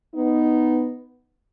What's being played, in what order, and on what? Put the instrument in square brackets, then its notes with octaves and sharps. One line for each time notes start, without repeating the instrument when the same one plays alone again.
[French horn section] B3 D#4